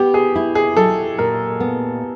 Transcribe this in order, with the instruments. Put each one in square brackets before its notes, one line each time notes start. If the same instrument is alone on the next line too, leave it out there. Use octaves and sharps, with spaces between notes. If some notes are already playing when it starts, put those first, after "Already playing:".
Already playing: [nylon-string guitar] B3 [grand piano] G4
[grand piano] G#4
[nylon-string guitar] E4
[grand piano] G#4
[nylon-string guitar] F#3 [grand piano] A4
[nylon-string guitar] A#2 [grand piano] A#4
[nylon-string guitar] B3